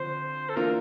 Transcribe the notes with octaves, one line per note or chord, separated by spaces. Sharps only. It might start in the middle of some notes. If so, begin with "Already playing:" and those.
Already playing: D3 F3 C4 C5
A4
E3 A#3 D4 F4 A#4